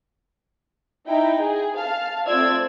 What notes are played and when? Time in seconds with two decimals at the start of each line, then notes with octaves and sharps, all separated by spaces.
1.07 D#4 E4 G5
1.40 G#4
1.77 F5 A5
2.27 A3 C4 F4 D5 E6 G#6